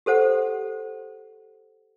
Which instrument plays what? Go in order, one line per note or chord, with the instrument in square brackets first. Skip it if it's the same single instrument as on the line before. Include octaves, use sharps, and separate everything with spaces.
[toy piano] G4 A4 C5 F#5